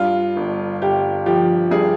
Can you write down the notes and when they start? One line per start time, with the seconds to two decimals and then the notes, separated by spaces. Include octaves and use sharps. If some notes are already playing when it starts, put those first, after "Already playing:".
Already playing: G2 F4
0.36 G1
0.82 G1 G4
1.26 F3 G4
1.71 G2 G#4